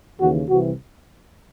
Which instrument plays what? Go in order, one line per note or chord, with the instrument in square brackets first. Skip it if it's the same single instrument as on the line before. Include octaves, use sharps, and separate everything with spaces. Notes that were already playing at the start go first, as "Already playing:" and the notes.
[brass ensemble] D#2 C#3 E3 F#4
C2 C3 E3 F#4